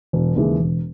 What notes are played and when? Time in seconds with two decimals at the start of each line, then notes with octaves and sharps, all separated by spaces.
0.13 E1
0.36 D#2 C#3 E3 G#3
0.59 E1